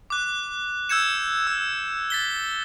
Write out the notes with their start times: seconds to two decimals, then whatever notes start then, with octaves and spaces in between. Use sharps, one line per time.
0.10 D6 F#6
0.89 E6 G6 G#6 C#7 E7
1.47 E6
2.10 A6 B6 G7